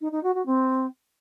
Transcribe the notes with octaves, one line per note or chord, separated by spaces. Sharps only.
D#4
D#4
F#4
F#4
C4